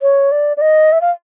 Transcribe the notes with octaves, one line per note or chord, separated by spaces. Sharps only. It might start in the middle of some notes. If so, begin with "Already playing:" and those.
C#5
D5
D5
D#5
E5
F5